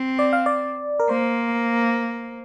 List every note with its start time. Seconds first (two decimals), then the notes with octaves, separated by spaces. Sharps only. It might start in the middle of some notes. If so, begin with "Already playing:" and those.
Already playing: C4
0.19 D5
0.33 F5
0.46 D5
1.00 A#4
1.09 A#3 C5